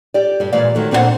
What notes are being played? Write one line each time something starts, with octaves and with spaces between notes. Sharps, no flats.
G4 D5
G2 G3
A#2 E3 G#3 D5 F5
D#3 F#3 A3
A#2 C4 D4 B4 C5 F#5